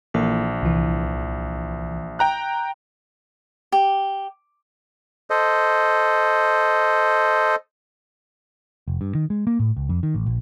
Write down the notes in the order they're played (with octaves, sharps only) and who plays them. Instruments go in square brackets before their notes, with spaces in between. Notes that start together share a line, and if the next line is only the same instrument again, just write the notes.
[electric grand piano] A#1 [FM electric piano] E3 A#3 A4
[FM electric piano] C2 E3
[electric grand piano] G5 A#5 F#6
[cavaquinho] G4
[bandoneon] A4 C5 D#5
[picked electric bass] F1
G2
D#3
G#3
A#3
A2
C#2
F2
D#3
A1
A#1